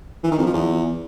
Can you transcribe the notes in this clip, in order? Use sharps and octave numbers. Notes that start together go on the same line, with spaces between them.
E3
D#3
F2
F3
E2